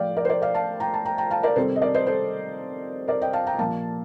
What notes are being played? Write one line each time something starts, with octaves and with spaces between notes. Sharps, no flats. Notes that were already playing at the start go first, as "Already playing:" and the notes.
Already playing: A2 F3 A3 D5 F5 G5
A#4 D5
C5
A#4 D5
D5 F5
F5 A5
G5 A#5
A5
G5 A#5
G5 A#5
F5 A5
A#4 D5
C3 D#3 G3 C4 A4 C5
D#5
A#4 D5
C5 D#5
A4 C5
A#4 D5
D#5 G5
F5 A5
G5 A#5
A#2 F3 A#3 F5 A5